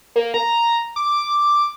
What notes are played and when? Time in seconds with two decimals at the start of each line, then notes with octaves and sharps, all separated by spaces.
0.16 A#3
0.34 A#5
0.96 D6